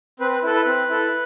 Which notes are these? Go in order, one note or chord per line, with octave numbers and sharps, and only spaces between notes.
C4 B4
B4
E4 A4 B4
B4
C4
E4 A4